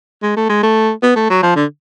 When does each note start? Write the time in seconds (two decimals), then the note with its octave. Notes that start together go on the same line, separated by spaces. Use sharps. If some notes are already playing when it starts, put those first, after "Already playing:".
0.23 G#3
0.37 A3
0.50 G#3
0.63 A3
1.03 B3
1.16 A3
1.30 F#3
1.43 F3
1.56 D3